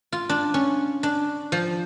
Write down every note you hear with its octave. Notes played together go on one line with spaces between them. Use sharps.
F4
D4
C#4
D4
F3